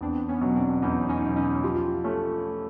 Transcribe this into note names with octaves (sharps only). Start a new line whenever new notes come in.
E2 C4 D4
B3 C#4
B2 F#3
C4 D4
E2 C#4 D#4
C#4 D#4
B2 F#3
C#4 D#4
F3 F4 G4
A3 C#4